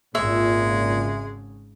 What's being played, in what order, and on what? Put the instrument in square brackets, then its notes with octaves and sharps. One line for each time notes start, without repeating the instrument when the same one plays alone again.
[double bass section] G#1 C#3 [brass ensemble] A#2 [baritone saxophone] G#3 [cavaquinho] E5